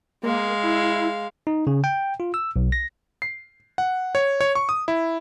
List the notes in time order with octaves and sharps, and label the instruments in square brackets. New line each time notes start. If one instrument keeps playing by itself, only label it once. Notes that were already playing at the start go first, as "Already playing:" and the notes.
[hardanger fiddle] G#3 F5 [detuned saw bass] A#3
[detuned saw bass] E4
[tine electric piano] D#4
C#3
G5
F4
E6
B1
A#6
[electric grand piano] C7
F#5
C#5
C#5
C#6
D#6
E4